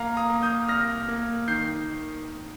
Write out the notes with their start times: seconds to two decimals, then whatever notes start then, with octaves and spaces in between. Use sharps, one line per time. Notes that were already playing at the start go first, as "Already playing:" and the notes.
Already playing: A#3 F5 A#5
0.17 A#5 D#6
0.30 A#3
0.43 D#6 G6
0.69 C2 F6 A#6
1.08 A#3
1.48 D#3 G6 C7